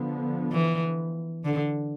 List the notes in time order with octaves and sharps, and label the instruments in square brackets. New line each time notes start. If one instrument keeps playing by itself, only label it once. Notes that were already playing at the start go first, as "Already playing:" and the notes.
Already playing: [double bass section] D3 F3 B3
[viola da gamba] E3
D3